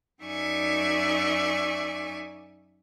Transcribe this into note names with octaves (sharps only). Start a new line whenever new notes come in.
F#2 D#4 D5 E5 G#5 C#6